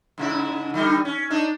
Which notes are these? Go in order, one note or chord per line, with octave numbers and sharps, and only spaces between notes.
G#2 C#3 E4
D3 G3 D#4
C#4
D4 D#4